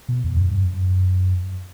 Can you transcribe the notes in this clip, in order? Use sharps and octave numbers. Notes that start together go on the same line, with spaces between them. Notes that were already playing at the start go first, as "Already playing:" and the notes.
B2
E2
F#2
G2
F#2